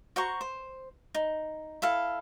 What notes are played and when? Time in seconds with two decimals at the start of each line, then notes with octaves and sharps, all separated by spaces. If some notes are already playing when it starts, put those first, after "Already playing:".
0.16 F#4 C5 A#5 C#6
0.41 C5
1.15 D#4
1.82 E4 A4 F5